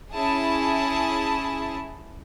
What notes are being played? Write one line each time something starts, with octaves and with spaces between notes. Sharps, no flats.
C#4 E4 G#4 A5